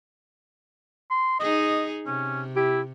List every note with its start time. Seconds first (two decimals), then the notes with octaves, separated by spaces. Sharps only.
1.11 C6
1.40 D#4 G#4 D#5
2.06 C3 C#4
2.56 E4 G4